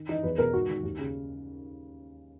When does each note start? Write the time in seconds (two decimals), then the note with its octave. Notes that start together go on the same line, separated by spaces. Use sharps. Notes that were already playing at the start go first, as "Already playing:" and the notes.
Already playing: D#3
0.09 E3 D#4
0.23 E2 B4
0.38 B2 A#4
0.53 G#2 F#4
0.69 D#3
0.83 D#2
0.98 C#3